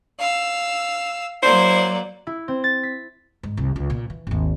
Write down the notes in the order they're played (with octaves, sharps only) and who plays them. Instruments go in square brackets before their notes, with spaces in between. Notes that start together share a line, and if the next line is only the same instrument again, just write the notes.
[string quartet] F5 E6
[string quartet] F#3 A#3 D5 [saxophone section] E4 C5
[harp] E4
C4
A6
B6
[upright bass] G#2
C2
C#2
A#2
E3
G#1 D#2